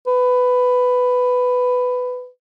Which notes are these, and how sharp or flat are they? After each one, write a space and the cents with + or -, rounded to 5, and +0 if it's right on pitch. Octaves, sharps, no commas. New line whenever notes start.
B4 +10